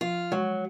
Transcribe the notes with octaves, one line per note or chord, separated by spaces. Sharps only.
F3 F4
F#3 G#3